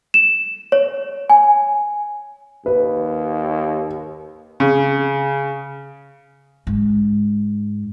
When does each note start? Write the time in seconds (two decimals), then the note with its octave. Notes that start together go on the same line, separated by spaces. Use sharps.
0.14 E7
0.72 C#5
1.30 G#5
2.66 D#2 B4
4.60 C#3
6.67 G#2